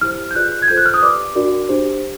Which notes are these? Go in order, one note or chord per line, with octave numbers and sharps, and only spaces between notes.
E4 G4 C5 F6
G6
F4 G#4 B4 D5 F#6
G#6
F4 A4 C5 G6
F#6
F6
D#6
G4 B4 D5 D6
D4 F#4 A#4 D5
D4 G4 C5